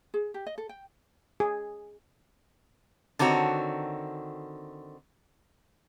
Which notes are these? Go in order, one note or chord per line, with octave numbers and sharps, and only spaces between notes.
G#4
G4
D#5
A4
G5
G#4
D3 D#3 C4 F#4 C#5